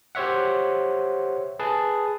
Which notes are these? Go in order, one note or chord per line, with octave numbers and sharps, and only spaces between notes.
G4 C5 C#5 E5 F#5
G#4 B4 A5